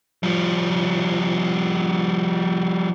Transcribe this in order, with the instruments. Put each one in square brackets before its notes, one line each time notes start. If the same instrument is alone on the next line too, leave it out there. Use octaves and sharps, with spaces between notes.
[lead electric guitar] F3 G3